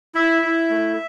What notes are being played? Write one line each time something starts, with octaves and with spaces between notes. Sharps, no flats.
E4 E5
E4
A3